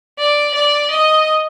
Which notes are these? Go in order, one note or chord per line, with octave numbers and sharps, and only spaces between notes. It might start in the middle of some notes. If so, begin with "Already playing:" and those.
D5
D5
D#5